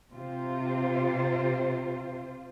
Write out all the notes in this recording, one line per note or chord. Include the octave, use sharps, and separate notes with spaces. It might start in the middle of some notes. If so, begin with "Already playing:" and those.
C3 F4 C5